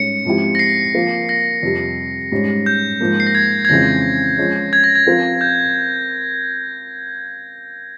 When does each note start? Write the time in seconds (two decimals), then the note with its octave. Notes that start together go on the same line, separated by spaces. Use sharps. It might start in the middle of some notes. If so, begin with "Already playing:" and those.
Already playing: G#2 G3 C#4 C#7
0.25 G#2 F3 C4 E4 G4
0.55 A#6
0.59 C7
0.95 F3 A#3 F4 A#4
1.29 A#6
1.63 F2 C3 G3
2.32 G#2 G3 C#4
2.66 G6
3.00 G#2 F3 A#3
3.20 C7
3.27 A#6
3.35 G#6
3.65 G#6
3.69 F2 C#3 E3 G#3 C4 A#6
4.38 F3 G#3 C#4
4.73 G#6
4.84 A#6
4.96 G#6
5.07 F3 C4 F4 A#4
5.41 G6